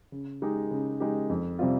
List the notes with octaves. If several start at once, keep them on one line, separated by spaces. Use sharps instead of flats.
C#3
G#3 D#4 G4
C#3
G#3 D#4 G4
F2
C3 G3 C4 F4